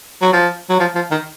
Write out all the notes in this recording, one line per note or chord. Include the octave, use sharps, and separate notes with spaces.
F#3
F3
F#3
F3
F3
D#3